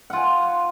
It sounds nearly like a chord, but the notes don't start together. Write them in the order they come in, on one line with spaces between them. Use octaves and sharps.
F#5 F4 G#5